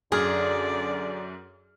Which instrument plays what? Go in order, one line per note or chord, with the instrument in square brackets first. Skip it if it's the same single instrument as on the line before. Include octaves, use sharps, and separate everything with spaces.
[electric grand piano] F#2 F6 [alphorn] D3 [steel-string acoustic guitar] G#4 [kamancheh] D5